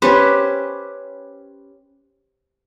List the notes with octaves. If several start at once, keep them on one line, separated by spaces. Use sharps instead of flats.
C#4 G4 B4 C5